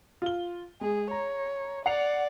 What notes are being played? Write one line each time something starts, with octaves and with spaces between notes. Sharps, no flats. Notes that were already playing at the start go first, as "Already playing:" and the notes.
F4 G7
G#3 G#4
C#5 A#5
D5 F#5 C7 F7